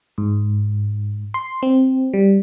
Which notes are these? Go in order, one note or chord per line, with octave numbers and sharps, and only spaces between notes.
G#2
C6
C4
G3